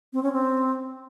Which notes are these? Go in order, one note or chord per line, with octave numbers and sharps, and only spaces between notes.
C4
C#4
C4